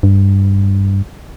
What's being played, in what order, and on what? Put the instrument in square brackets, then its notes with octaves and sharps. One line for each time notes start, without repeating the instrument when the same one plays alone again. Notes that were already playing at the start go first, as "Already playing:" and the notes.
[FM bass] G2